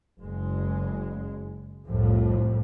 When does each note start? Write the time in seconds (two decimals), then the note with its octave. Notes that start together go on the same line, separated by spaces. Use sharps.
0.20 F#1 G#3
1.89 C2 F2 A2 F3